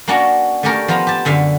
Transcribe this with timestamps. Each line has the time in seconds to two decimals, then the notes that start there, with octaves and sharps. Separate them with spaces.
0.08 A#3 C#4 D4 F#4 F#5 A#5
0.63 A3 C#4 D4 G4 A#4
0.88 F3 B3 F4 F5 A#5
1.07 G4 A5
1.25 F#2 D3 E5 F5